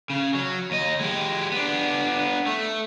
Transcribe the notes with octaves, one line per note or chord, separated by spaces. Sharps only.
C#3
F#3
D#2 D#5
G#3 G4
B3 D4
A3